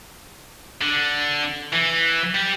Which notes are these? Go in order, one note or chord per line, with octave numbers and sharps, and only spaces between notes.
D3
E3
G3